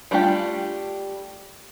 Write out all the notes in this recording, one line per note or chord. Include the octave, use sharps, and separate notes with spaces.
G3 A3 D4 F4 G4